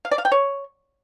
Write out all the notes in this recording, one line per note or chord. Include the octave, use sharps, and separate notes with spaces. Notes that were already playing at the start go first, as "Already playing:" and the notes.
F5
D5
F5
G5
C#5